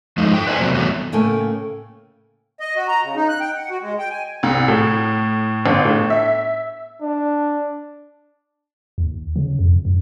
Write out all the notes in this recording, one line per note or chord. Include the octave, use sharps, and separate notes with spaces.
F3 G#3 A3 D#4
A4 G5
B4 C5 D5 E5 G#5
C3 F#3 A#3 C4
E3 F#3 G3 A3 B3
A2 C#3 A3 A#3 G5 G#5
D#5
F#4
A#5
C#3
D#4
F#6
G5
F#5
F#4
G#3
G5
G#5
C2
A2
G1
A2
E5
D4
D#2
C#3
F2
F#2